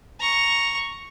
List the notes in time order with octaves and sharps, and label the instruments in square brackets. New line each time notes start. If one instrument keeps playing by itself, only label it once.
[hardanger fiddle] A#5 C#6